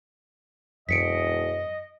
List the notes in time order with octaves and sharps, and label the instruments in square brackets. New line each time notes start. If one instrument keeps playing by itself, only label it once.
[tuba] E1 [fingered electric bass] F#2 [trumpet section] D#5 [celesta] B6 C#7 D7